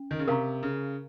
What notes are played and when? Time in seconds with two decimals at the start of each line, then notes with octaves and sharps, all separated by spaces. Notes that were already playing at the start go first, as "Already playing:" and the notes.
Already playing: C#4
0.11 D#3
0.19 C#3
0.27 C3 A#4 F5 A#5 C#6
0.63 C#3